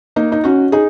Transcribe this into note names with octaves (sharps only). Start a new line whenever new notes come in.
A#3 D#4
D#4
C#4 F#4
D#4 G#4